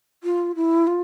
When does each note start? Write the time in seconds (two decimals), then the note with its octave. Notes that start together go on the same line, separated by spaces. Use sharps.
0.24 F4
0.56 E4
0.87 F4